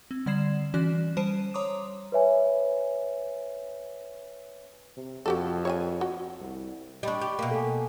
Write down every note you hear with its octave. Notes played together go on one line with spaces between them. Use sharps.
C4
D3 G3 D5 G#6 C7 E7
E3 C#4 F#4 D5 F#6
G3 C5 A5 C7 D7 D#7
C#5 A#5 C6 D6 D#6
B4 C#5 E5 G#5
C3
F2 F#4 G4 A4
C#5 E5 G#5
F#4
C2
G3 D4 D#5 B5 C#6
G4
B2 A#3
A4 G#5